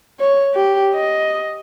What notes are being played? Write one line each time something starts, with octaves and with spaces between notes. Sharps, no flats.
C#5
G4
D#5